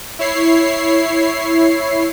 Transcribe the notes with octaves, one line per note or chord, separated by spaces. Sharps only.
E4 C#5 C7